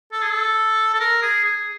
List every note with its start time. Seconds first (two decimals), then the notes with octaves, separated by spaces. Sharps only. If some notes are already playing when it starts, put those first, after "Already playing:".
0.12 A4
0.23 G#4
0.31 A4
0.95 A4
1.00 A#4
1.22 G#4
1.45 G#4